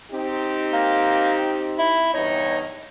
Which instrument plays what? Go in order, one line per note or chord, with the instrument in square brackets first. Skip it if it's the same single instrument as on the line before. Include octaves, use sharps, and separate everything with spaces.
[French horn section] C4 D#4 G4
[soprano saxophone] A#3
E4
[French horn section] E2 G2 C#5 [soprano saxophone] D#4